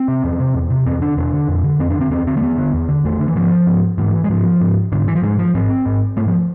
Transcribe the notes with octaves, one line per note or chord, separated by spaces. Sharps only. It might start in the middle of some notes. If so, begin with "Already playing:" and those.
Already playing: C4
C3
E2
C3
E2
C3
E2 C4
D3 D4
E2 D4
D3
F2
D3
F2 C4
D4
D3
C4
E2 C4
D3 C4
A3
E2 B3
D3
E2
D3
E2 A3
D3
E3
G#2 F3
G#2
G#2 E3
G#3
G#2 F3
G#2
G#2 D3
E3
F3
G#2 G#3
F3
G#2 C4
G#2
G#2 A3
F3